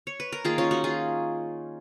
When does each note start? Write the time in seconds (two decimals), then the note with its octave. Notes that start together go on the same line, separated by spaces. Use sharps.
0.07 C#5
0.20 B4
0.32 A#4
0.45 D#3 A#3 F4 G#4
0.58 C#4 F4
0.71 D#4 F#4
0.84 F4 G#4